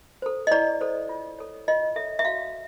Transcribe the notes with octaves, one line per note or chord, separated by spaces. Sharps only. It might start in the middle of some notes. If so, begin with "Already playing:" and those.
A4 C5
D#5
E4 D5
A4 C5
F4
A4 C#5
F4 D#5
A4 C#5 E5
E5
F#4 F5